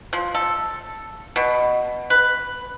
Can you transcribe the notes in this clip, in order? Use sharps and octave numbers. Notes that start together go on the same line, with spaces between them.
F3
A4
B2
B4